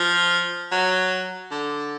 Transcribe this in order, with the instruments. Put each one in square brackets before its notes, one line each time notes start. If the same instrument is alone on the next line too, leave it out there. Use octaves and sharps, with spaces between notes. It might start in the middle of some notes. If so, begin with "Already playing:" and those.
Already playing: [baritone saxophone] F3
F#3
D3